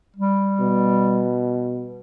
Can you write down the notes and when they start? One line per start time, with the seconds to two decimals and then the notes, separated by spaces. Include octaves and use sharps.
0.16 G3
0.60 B2